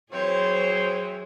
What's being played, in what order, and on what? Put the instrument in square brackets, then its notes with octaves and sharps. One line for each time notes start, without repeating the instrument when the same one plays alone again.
[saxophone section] E3 C4 [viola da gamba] F#3 G#4 [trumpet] C5 [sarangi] C#5